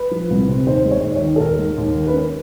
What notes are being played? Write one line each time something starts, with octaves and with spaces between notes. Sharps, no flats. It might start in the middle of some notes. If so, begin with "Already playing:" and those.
Already playing: B4
F3
C2
C3
D#2 C5
G#3
C#5
D#2
C#5
D#3
A4
D#2 A#4
G#3
D#2
D#3
B4
C#4 A#4